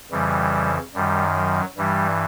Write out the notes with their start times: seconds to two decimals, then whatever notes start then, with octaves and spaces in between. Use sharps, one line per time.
0.11 F2 C#3 E3 G3
0.94 F#2 D#3 G3
1.36 F#3
1.77 G2 E3 G3